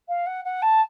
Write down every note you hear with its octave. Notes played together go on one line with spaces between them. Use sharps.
F5
F#5
F#5
A5